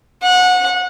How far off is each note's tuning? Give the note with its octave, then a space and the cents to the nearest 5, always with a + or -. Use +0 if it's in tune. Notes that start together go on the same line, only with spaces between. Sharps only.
F#5 -25